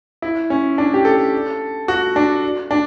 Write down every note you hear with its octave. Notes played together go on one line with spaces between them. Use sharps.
E4
C#4
D4
G4
A4
F#4
D4
D4